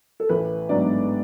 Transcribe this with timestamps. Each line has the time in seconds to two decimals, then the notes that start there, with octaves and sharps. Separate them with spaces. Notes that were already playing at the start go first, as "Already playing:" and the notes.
0.20 A4
0.29 A1 B4
0.69 G#2 F#3 B3 D4 D5